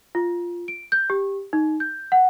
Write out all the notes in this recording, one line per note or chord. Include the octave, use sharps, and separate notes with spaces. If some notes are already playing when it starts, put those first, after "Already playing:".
F4
D7
G6
G4
D#4
G6
F#5